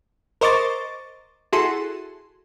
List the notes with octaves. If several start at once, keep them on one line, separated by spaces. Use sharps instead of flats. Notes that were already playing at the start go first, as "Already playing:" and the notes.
A#4 C5 D#5 C#6 D6 A6
E4 F#4 G#4 A4 C6